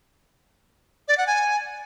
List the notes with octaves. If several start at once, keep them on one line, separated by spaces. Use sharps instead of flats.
D5
F#5
G#5